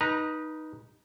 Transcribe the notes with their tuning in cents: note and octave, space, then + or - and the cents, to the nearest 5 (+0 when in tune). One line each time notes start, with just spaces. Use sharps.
D#4 +0 B4 -25 A#5 +0